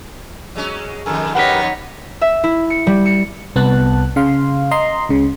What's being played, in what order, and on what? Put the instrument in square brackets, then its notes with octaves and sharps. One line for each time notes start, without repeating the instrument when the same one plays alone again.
[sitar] F#3 G#3 C#4
[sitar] F2 D#3 [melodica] A4 A#4 G#5
[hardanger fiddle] D#4 C#5 [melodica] G4 A#4 B4 [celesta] F#5 B6
[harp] E5
E4
C#7
G3
C#7
[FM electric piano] C2 B3 A5 F#6
C#3 F5 C6
D#5 A#5 C6
C#2 C#3